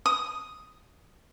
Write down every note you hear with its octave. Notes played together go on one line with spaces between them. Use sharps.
D#6